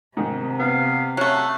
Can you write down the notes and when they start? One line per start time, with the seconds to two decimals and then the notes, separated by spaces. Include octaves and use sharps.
0.17 G#2 C3 D#3
0.60 B3 F5
1.17 F#3 A3 C#4 F#5